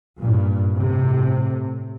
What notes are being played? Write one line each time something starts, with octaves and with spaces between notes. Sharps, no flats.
G2 A#2
A2 C3